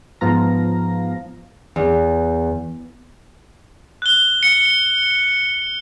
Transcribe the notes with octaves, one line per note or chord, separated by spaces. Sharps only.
G#2 F3 B3 F5 A#5 A#6
E2
F#6 G7
C#7